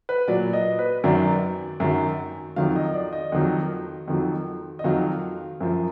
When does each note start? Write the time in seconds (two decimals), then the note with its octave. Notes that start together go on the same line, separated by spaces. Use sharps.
0.09 B4
0.28 A#2 F#3 D5
0.53 D#5
0.79 B4
1.04 F#2 D#3 F#3 D5
1.80 F#2 D#3 F#3
2.56 F2 D#3 F#3 F5
2.76 D#5
2.94 D5
3.13 D#5
3.32 F2 D#3 F#3
4.08 F2 D#3 F#3
4.79 D#5
4.84 F2 D#3 F#3 F5
5.60 F#2 F3